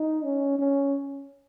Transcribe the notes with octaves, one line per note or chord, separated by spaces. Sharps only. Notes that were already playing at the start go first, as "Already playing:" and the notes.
Already playing: D#4
C#4
C#4